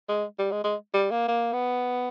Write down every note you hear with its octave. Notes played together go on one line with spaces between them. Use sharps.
G#3
G3
G#3
G#3
G3
A#3
A#3
B3